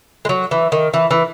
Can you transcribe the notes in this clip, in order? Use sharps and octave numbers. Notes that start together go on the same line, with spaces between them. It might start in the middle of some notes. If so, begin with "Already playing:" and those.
G#3
F#3
E3
D#3
E3
E3